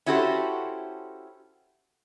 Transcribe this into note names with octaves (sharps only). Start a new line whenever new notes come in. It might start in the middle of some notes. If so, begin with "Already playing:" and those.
C#4 E4 F#4 G4 A4 C5